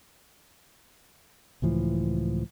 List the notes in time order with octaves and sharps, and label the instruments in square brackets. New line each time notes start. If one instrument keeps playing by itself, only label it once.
[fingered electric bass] C#2 A2 E3 F3